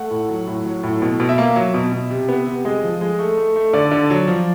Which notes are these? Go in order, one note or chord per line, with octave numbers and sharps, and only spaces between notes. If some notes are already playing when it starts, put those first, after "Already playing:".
Already playing: A3 F#5
A2
F#3
A2
F#3
A2
B2
B2
E5
A#3
F#3
B2
B2
C3
B3
C3
G#3 D#5
F3
G#3
A3
A3
A3
D3 D5
D3
F#3
F3